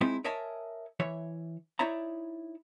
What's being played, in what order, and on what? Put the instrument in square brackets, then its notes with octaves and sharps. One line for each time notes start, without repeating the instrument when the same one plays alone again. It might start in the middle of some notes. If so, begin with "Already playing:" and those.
[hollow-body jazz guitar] G#3 C4 D#4 E4
A#4 C#5 D#5 E5 G#5 A5
E3 C#5 E5
D#4 E4 C#5 D5 E5 A#5